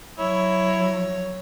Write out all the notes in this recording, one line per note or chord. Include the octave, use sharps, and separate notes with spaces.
F#3 E4 C#5